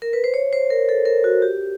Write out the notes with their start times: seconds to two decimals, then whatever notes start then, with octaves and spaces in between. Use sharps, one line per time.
0.02 A#4
0.13 B4
0.24 C5
0.34 C#5
0.53 C5
0.70 A#4
0.89 A4
1.06 A#4
1.24 F#4
1.42 G4